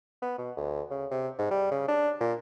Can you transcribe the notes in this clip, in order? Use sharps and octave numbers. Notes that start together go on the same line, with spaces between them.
B3
B2
D2
C#3
C3
G#2
G3
C#3
D4
A#2